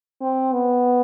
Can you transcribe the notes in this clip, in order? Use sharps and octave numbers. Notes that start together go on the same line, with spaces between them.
C4
B3